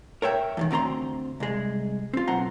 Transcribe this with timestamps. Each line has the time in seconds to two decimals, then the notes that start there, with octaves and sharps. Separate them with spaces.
0.22 A#4 C#5 E5 G5
0.57 E2 A2 D#3
0.71 D2 C4 A#4 A#5 C6
1.40 C2 G#3
2.13 C4 F4
2.28 B1 C4 C5 F#5 A#5